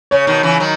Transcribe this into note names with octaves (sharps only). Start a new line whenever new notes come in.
C#3 C#5
B2 D#3
C#3 E3
D#3 F#3